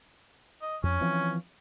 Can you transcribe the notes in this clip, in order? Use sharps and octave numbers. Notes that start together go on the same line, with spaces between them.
D#5
F2 C#4
E3 F3 C4